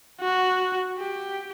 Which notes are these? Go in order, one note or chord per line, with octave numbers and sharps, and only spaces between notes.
F#4
G4